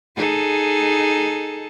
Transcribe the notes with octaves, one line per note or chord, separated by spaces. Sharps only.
D#4 G#4 A4